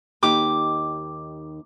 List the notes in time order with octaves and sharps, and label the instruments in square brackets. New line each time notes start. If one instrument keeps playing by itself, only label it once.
[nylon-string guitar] D#2 D#4 G4 [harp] D6